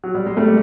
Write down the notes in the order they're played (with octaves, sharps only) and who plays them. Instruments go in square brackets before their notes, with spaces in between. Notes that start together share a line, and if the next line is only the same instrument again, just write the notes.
[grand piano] F#3
G3
G#3
G3 A3